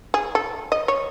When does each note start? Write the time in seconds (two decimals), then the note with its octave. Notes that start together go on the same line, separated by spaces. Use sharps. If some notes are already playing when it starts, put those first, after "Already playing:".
0.14 G#4
0.35 A4
0.72 D#5
0.88 C#5